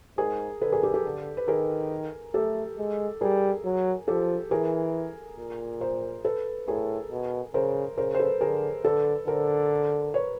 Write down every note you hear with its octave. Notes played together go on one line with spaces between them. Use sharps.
G#2 G#4 A#4
D3 A4 B4
G#4 A#4
G4 A4
G4 A4
D3
B4
D#3 G#4 A#4
A3 G4 A4
G#3
G3 G#4 A#4
F#3
F3 G4 A4
E3 G#4 A#4
A#2
A#4 C5
A4 B4
A2 G#4 A#4
B2
C#3 A#4 C5
C#3 A#4 C5
C5
A4 B4
D3 G#4 A#4
D3 A4 B4
D3 A#4 C5
B4 C#5